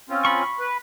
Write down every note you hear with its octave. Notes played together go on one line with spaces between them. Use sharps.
C4 C#4 F4
B5 C#6
B4